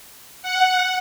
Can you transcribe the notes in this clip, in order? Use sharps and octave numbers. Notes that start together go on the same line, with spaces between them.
F#5